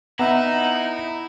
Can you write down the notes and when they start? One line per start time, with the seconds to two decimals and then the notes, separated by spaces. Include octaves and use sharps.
0.19 B3 D#4 E4 E5 F#5 A#5